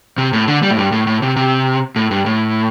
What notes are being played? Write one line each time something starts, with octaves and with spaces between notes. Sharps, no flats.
C3
A2
D3
G3
A2
G2
A2
A2
C3
C3
A2
G2
A2